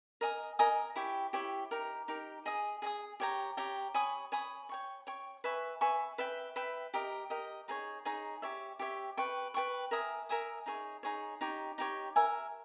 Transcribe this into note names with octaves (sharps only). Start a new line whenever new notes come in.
A#4 D#5 G#5 D#6
A#4 D#5 G#5 D#6
E4 G4 C#5 G5
E4 G4 C#5 G5
D#4 G4 A#4
D#4 G4 A#4
G#4 D#5 G#5 D#6
G#4 D#5 G#5 D#6
G4 C#5 G5 A#5
G4 C#5 G5 A#5
C#5 G#5 B5 D#6
C#5 G#5 B5 D#6
C#5 G5 C#6
C#5 G5 C#6
B4 E5 G#5 C#6
B4 E5 G#5 C#6
B4 E5 G5
B4 E5 G5
G4 A#4 D#5
G4 A#4 D#5
D#4 G#4 C#5
D#4 G#4 C#5
G4 C#5 E5
G4 C#5 E5
B4 G5 C#6
B4 G5 C#6
A#4 E5 G#5 D#6
A#4 E5 G#5 D#6
D#4 G#4 C#5
D#4 G#4 C#5
D#4 G4 C#5
D#4 G4 C#5
A#4 E5 G#5